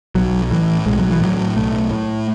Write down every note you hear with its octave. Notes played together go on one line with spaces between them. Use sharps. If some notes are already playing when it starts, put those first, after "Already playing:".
B1 F#3
A2 E3
B1 G#3
F#3
E3
A2 F#3
B1 A3
A2